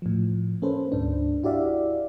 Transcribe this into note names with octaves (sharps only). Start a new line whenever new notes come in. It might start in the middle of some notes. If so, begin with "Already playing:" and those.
A2 F3
A#3 C#4 A4 B4 C5
D2 G#2 D4
E4 F#4 G4 D5 E5 F5